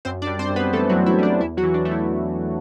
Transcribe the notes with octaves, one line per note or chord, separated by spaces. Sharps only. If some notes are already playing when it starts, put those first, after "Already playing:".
F#2 C4 C5
D4 D5
G3
C4 C5
F#2
B3 B4
E3 A3 A4
F#3 F#4
F#2
E4
G3 D4
E2 E4
F#3 F#4
E3
D4
A3
E4